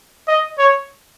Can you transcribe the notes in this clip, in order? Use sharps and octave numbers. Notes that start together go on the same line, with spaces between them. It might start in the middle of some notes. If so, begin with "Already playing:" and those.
D#5
C#5